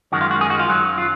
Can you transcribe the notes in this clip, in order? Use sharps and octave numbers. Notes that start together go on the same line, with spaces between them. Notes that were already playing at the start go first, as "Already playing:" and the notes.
F#2 D#3 G#3 F#4
F4
F#4
G#4
F#4
F4
F#2 D#3 F#3
F4